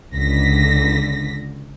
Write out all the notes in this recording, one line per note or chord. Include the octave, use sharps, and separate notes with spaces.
C#2 D3 A#6 B6